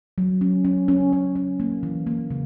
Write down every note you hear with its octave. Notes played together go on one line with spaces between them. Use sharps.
F#3
C#4
C#4
C#4
C#4
C#4
A#3
E3
A#3
C#3